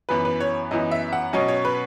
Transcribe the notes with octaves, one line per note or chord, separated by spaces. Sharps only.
F#2 E3 B3 E4 B4
B4
C#5
F#2 E3 B3 E4 D#5
E5
F#5
B2 F#3 C#4 D#5
C#5
B4